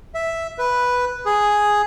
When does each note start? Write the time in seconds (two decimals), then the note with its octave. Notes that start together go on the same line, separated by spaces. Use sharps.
0.15 E5
0.58 B4
1.26 G#4